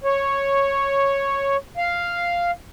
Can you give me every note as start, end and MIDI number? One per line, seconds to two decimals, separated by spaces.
0.04 1.57 73
1.77 2.51 77